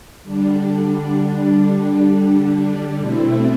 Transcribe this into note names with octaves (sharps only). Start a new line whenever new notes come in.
D3 G3 D4
B2 A3 C4 E4